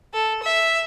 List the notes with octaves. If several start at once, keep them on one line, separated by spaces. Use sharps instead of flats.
A4
E5